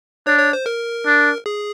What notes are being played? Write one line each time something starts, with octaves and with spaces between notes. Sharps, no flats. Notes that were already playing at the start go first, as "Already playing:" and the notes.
D4 C#5
C#5
C5
A#4
D4
G#4